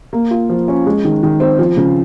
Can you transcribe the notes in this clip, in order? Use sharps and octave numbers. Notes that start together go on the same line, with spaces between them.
A#3
F4
F3
C#4
G#3
D#3
D#3
C4
F3
C#3